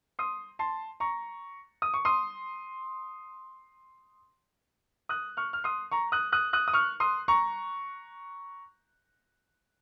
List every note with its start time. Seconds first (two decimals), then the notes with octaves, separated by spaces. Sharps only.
0.19 C6 D#6
0.59 A5 C6
1.00 A#5 C#6
1.82 D#6
1.94 C#6
2.05 C6 D#6
5.09 D#6 F#6
5.37 C#6 F6
5.53 F6
5.64 C6 D#6
5.91 A#5 C#6
6.12 D#6 F#6
6.32 D#6 F#6
6.53 D#6 F#6
6.68 D#6
6.73 C#6 F6
7.00 C6 D#6
7.28 A#5 C#6